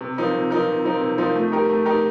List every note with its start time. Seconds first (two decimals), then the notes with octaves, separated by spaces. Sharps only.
0.01 C3
0.17 F3 C4 D#4 A#4
0.34 C3
0.50 F3 C4 D#4 A#4
0.68 C3
0.84 F3 C4 D#4 A#4
1.01 C3
1.18 F3 C4 D#4 A#4
1.35 A3
1.52 D#4 G4 A#4
1.69 A3
1.85 D#4 G4 A#4